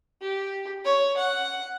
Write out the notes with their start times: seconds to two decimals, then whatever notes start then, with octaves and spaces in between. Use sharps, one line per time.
0.22 G4
0.85 C#5
1.17 F#5